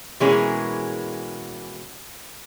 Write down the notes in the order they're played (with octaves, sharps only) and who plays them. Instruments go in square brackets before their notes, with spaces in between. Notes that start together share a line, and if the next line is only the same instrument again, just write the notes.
[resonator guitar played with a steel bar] B2 E3 G#3 A#3 C#4 G#4